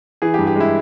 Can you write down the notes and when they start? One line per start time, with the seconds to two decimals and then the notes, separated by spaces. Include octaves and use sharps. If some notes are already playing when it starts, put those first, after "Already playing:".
0.22 E3 G#4
0.34 G4
0.38 G2
0.47 G4
0.56 G#3 E4